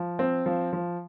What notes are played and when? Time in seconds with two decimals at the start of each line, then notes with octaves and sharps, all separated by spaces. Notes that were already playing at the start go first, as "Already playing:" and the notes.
Already playing: F3
0.19 C4
0.46 F3
0.73 F3